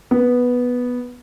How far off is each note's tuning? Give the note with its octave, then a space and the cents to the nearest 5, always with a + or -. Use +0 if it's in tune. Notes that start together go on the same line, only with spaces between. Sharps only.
B3 -5